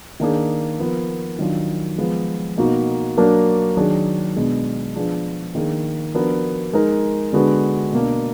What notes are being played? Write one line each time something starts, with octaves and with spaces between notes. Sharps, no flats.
D#3 A#3 D4 G#4
F3 B3 F4 A#4
D#3 F#3 D4 F4
F3 G#3 B3
B2 A#3 D#4 F#4
F#3 A#3 D4 F#4 A#4
D#3 F#3 D4 G#4
B2 G#3 D4
F3 B3 D4 G#4
D#3 A#3 D4 G#4
F3 B3 D4 F#4 A#4
G#3 D#4 A#4
D3 G#3 B3 D4 F#4
B2 A#3 D4